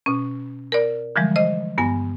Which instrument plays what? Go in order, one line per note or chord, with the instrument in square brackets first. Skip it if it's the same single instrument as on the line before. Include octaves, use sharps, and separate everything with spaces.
[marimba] B2 C#4
A#4 D5
D3 E3 F3 G3 G#3
C5 D#5
G2 B3 G#5